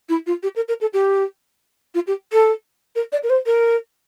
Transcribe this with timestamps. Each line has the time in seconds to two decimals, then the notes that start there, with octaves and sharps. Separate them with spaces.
0.09 E4
0.26 F4
0.43 G4
0.56 A#4
0.68 A#4
0.81 A4
0.93 G4
1.94 F4
2.07 G4
2.32 A4
2.95 A#4
3.12 D5
3.23 A#4
3.30 C5
3.46 A#4